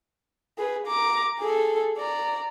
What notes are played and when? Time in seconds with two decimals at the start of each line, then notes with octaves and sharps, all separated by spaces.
0.58 G#4 B4
0.87 A#5 D6
1.39 G#4 A4
1.98 D5 A#5